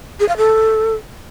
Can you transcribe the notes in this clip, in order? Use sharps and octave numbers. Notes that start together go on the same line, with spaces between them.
G#4
F5
A4